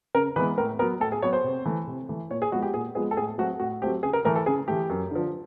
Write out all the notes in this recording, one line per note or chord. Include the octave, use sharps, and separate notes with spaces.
C#3 A#4
E3 G#3 B3 B4
A2 A#4
F#3 B3 A#4
A2 A4
G#4
F#3 B3 C#5
C5
C3
E3 A3
C3
E3 A3
A#2 C#5
G#4
F3 G#3 B3 F#4
G4
A#2 G#4
F3 G#3 B3 G#4
A4
A2 G#4
F#3 A3 C4 F#4
A2 F#4
F#3 A3 C4 G4
C#3 G#4
A#4
E3 A3 A#4
A4
C#3 G#4
E3 A3 G4
F#2
D3 F3